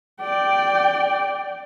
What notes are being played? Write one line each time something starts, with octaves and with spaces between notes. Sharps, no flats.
D5 G5